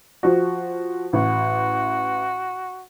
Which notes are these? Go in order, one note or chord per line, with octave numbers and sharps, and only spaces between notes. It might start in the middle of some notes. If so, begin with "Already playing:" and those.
F3 F#4
A1 F#4